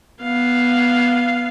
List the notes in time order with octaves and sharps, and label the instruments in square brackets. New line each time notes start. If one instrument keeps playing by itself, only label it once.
[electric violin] B3 F5